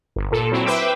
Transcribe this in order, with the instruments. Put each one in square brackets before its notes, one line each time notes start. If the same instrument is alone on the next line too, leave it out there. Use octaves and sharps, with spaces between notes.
[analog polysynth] G1
A#2 A4
F#3 C4 E4
B4 C5 E5 G5 D6 E6